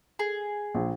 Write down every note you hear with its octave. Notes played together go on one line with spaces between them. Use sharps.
G#4
A#1